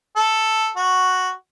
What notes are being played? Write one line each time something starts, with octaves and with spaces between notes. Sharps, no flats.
A4
F#4